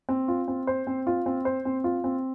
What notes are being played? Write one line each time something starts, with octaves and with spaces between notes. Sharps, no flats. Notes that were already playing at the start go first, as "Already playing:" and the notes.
C4
F4
C4
C5
C4
F4
C4
C5
C4
F4
C4